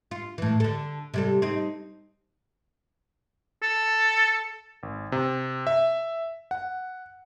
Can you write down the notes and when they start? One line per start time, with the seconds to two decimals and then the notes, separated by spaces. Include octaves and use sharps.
0.11 F4
0.38 A2 E3
0.60 D3 A4
1.14 C3 G3 A4
1.42 C4 D#4
3.62 A4
4.83 G#1
5.12 C3
5.67 E5
6.51 F#5